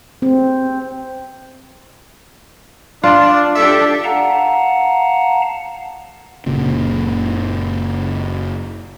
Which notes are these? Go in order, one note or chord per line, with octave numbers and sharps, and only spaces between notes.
C4
D4 F4
D4 G4 A4 E5
F5 F#5 A5 A#5
F#1 A#2 C#3